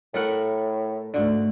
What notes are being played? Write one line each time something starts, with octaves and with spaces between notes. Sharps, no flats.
A2 A3 A#4 F#5
G#2 D3 A3 F#4